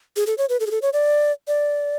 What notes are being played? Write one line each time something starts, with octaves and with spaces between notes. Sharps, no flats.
G#4
A4
C#5
B4
A4
G#4
A4
C#5
D5
D5